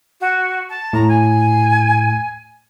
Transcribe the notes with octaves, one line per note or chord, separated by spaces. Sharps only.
F#4
A5
A2 A#5
G#5